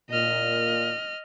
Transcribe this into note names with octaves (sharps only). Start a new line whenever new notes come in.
A#2 D#5 F6